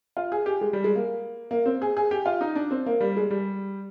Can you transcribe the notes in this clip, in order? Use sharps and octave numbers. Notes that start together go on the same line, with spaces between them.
F4
G#4
G4
G#3
G3
G#3
A#3
A#3
C4
G#4
G#4
G4
F4
D#4
D4
C4
A#3
G3
G#3
G3